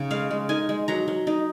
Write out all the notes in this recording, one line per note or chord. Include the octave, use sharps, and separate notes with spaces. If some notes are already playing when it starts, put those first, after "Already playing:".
Already playing: C#3 D#4
G#3 F5
G#3
D#4 G#5
G#3
F#3 A#5
F#3
D#4